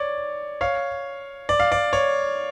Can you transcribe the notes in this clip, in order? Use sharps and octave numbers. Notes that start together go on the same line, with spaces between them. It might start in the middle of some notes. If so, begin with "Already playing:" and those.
Already playing: C#5 D5
C#5 F5
D5
F5
D5
C#5